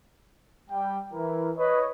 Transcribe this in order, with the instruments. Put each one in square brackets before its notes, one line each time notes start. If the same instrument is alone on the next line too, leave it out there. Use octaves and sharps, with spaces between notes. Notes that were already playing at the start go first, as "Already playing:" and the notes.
[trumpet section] G3 G5
[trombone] E3 [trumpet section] E4 A#4
[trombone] B4 [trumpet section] C#5 D#5